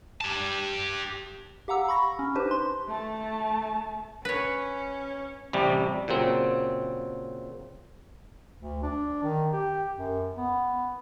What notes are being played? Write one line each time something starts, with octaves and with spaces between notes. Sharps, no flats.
G4 A5
G4 F5 F#5 A#5 E6
B5 C#6 A#6
C#4
D4 D#4 G4 B4 C5
C6
A3 A5
C#4 B4 C#5
A1 C3 G3
A#2 C#3 F#3 C4
D2
D4
D#3
G4
F#2
B3